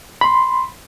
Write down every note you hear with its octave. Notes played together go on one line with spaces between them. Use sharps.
B5 C6